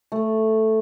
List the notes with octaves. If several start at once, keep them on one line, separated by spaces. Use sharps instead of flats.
A3